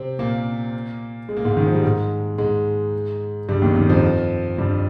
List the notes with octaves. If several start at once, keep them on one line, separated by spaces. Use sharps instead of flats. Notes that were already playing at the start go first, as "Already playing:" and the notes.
Already playing: C3 C4
A#2 A#3
G#3
A#3
G#2 G#3
D#3
F3
G3
G#2 G#3
G#2 G#3
G2 G3
D#2 D#3
D#2 D#3
F2 F3
G2 G3